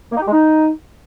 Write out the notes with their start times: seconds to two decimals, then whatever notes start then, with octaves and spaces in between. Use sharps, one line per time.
0.12 A#3
0.17 D#4
0.22 G4
0.27 G#3
0.33 D#4